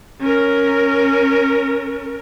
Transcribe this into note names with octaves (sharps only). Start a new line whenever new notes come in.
C#4 A#4